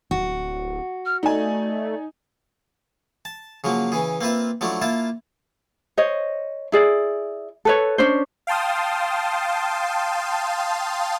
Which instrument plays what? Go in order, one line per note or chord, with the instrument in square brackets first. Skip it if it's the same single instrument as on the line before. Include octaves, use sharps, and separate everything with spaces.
[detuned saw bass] D1 [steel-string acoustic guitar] F#4
[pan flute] F6
[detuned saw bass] A3 [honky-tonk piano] D#4 G#5 [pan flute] D5
[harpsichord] A5
C#3 F3 F#3 A#3
C#3 E3 G#4
A#3 C4 F4 B4 E5
F3 F#3 A3 D4 E4
A#3 E4 F4 E5 A5
[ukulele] C5 C#5 D#5
E4 G#4 D5
A4 B4 C#5
C#4 D4 C5
[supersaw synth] F5 G5 A5 C6 D#6